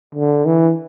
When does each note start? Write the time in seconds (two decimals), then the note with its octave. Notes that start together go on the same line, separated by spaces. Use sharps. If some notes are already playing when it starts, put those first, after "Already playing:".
0.15 D3
0.46 E3